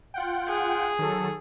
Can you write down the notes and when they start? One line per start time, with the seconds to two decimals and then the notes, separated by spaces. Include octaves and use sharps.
0.14 F4 F#5 G5
0.48 G#4
0.99 D#3 F#3 A4